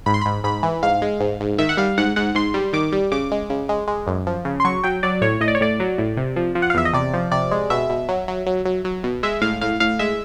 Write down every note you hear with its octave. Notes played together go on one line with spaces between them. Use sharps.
G#2 B5
C6
G#2 B5
G#2 B5
E3
G#2 F5
G#3
G#2
G#2
D#3 E5
F#5
G3 F5
G#2 F#5
G#2 F#5
G#2 C6
G3
D#3 D6
G3
C#3 D6
G#3
C#3
G#3
G#3
F#2
F3
C#3
C6
F#3 C#6
F#3 G5
F#3 D5
A2 C#5
A2 D#5
D5
C#5
A2 D5
F#3
A2
C3
F3
F3
F#5
F5
E2 E5
D#5
C3 D5
F3
C3 D5
G#3
B2 E5
B2
F#3
F#3
F#3
F#3
F#3
B2
G#3 E5
A2 F5
A2 F5
A2 F5
G#3 E5